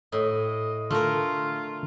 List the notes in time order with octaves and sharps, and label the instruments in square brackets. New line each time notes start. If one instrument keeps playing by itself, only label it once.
[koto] A2 [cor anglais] D#5
[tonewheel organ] D3 [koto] A3 A#4 [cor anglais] F4